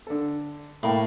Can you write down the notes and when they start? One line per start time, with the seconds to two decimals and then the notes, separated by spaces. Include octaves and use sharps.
0.07 D3 A4
0.83 A2 A#3 G5 A5 B5